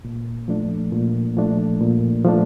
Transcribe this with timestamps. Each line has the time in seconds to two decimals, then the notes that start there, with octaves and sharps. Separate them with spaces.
0.05 A#2
0.48 F3 A3 D4
0.92 A#2
1.37 F3 A3 D4
1.81 A#2
2.24 F3 A3 D4